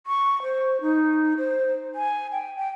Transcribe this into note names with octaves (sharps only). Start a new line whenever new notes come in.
C#6
C5
D#4
C5
G#5
G5
G5